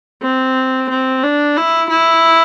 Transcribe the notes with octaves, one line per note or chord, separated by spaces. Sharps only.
C4
C4
D4
E4
E4